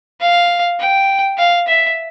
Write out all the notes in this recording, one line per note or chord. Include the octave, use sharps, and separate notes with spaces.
F5
G5
F5
E5